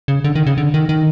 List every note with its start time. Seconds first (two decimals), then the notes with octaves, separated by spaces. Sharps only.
0.08 C#3
0.24 D3
0.35 D#3
0.47 C#3
0.58 D3
0.74 D#3
0.89 D#3